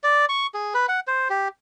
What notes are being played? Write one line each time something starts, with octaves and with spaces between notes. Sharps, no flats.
D5
C#6
G#4
B4
F#5
C5
G4